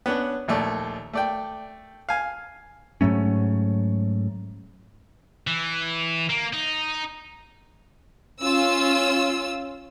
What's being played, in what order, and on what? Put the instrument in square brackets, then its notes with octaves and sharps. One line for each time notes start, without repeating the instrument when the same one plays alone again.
[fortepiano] B3 C#4 D4
A#1 D#2 A3 D5
A3 D5 G5
F5 G#5
[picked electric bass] G#2 F#3 A3 C#4
[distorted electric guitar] E3
A#3
D#4
[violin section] C#4 F4 E6